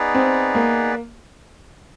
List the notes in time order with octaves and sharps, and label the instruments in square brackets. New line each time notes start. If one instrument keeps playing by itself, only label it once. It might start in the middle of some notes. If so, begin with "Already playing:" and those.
Already playing: [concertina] B3 D#4 G#4 B4 D5
[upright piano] C4
A#3